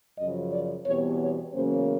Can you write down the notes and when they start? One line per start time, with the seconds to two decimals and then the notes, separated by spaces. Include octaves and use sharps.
0.19 F#2 C#3 F3 D#5
0.52 D5
0.86 E2 B2 G3 C4 C#5
1.20 C#5
1.54 E2 C#3 F#3 A#3 C#4 C5